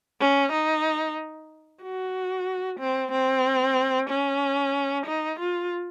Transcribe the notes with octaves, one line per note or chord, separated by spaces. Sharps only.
C#4
D#4
F#4
C4
C4
C#4
D#4
F4